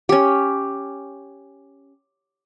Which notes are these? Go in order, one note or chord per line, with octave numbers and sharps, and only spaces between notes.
C#4 G4